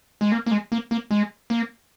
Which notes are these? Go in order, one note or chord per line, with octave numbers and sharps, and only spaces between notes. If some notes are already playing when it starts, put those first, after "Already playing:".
G#3
A#3
A#3
G#3
A#3
A#3
G#3
A#3